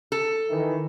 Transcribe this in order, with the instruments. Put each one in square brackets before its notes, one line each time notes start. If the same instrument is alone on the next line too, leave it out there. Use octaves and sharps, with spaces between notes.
[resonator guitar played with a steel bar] A4
[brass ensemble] D#3 E3